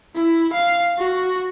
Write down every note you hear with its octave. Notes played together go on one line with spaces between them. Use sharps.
E4
F5
F#4